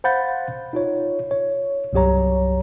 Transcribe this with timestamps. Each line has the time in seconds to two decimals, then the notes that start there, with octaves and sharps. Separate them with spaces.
0.04 C5 F5 F#5 B5 G6 A6
0.73 D#4 F4 C#5
1.31 C#5
1.93 C2 G2 F#3 G4 C#5 A#5